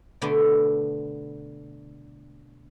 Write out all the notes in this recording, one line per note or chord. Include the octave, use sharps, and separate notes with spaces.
B2 D3 A3 B3 D4